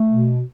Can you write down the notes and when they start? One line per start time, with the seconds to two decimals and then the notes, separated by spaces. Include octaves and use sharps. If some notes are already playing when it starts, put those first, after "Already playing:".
Already playing: A3
0.09 B2